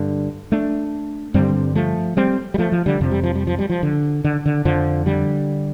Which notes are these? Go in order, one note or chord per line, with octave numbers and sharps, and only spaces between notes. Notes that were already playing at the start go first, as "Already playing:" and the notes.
Already playing: G2 D3
A3 D4
G2 D3 G3 C4
F3 A3
G3 C4
G3
F3 A3
F3
D3 G3
F2 C3 F3
G3
F3
G3
F3
G3
F3
D3
D3
D3
F2 D3 F3
D3 G3